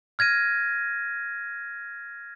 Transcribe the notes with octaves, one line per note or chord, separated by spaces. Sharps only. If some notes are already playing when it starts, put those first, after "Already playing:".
F6 G#6 A#6 D#7